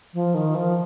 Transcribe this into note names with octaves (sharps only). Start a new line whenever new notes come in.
F3
D#3
F3